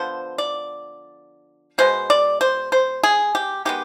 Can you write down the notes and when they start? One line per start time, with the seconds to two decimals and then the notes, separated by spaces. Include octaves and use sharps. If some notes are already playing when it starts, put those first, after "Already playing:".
Already playing: D3 F3 B3 C5
0.38 D5
1.78 B2 G#3 B3 C5
2.10 D5
2.41 C5
2.72 C5
3.03 G#4
3.35 G4
3.65 D#3 G#3 B3 G4